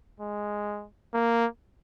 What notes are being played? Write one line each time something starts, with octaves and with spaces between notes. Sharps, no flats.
G#3
A#3